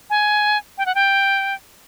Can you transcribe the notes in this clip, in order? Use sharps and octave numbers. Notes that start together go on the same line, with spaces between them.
G#5
G5
F#5
G5